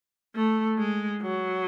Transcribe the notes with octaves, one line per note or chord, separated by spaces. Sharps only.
A3
G#3
F#3